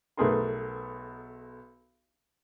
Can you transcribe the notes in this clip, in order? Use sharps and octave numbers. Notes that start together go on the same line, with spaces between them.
B1 A3 B3 G#4 A#4 C6